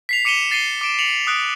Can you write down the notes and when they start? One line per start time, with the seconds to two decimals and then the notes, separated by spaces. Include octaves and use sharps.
0.09 B6 C7 F7
0.25 D6 C#7 D#7 E7 G7
0.51 A6 C7 C#7 D#7 G7
0.81 D6 D7 E7
0.99 C#7 F7 F#7
1.27 D#6 F#6 D7